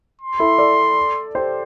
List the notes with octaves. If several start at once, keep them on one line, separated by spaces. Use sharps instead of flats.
C6
E4 A4
A4 D5
G4 C5